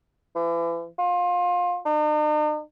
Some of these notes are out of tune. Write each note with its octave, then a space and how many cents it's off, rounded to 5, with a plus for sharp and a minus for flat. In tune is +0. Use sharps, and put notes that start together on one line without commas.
E3 +35
F4 +25
D#4 -45